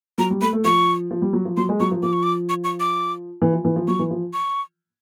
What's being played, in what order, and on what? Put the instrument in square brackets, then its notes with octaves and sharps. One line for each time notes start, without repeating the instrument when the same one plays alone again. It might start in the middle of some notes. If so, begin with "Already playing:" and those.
[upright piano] F#3 [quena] A#5
[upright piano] G3
[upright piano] A3 [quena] B5
[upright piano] A3
[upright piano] F3 [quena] C#6
[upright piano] F3
G3
F#3
F3
[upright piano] F#3 [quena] C6
[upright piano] G#3
[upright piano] F#3 [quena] C#6
[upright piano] F3
[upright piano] F3 [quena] D6
[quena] C#6
D6
C#6
C#6
D6
[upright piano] E3
F3
E3
F3
[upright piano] F#3 [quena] C#6
[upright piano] E3
F3
[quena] C#6